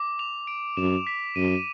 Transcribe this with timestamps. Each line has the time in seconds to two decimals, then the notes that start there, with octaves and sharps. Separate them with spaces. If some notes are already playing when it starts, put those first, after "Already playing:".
Already playing: D6
0.19 F7
0.47 D7
0.77 F#2 E7
1.07 B6
1.36 F#2 D#7